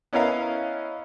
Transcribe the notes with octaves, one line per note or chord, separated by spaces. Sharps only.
B3 C#4 E4 A#4 D#5 F5